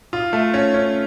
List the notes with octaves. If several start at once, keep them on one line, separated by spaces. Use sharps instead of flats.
F4
A3
C#4
C#4